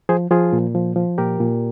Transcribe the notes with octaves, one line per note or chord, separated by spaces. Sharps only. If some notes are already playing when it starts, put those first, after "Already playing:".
F3 G#4 C5
F3 F4 G#4
A#2
F3
F3
A#2 G4 A#4
A#2